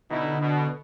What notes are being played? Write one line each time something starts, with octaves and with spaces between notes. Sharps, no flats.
B2 D3 D#4 E4
B2